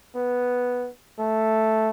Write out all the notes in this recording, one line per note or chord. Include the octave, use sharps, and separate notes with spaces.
B3
A3